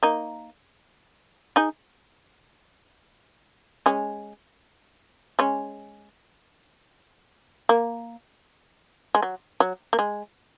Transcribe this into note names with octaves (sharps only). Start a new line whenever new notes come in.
A#3 D#4
D#4 G#4
G#3 C#4
G#3 C#4
A#3
G#3
F#3
F#3
A#3
G#3